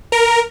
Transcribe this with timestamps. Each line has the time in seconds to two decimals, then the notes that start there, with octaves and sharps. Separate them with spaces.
0.12 A#4